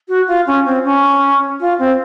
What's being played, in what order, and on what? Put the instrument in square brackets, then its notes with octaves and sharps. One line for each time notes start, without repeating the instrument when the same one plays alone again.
[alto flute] F#4
F4
C#4
C4
C#4
F4
C4